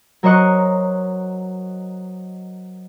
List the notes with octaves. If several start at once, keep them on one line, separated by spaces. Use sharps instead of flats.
F#3 A#4 C5 D#5 C#6 F#6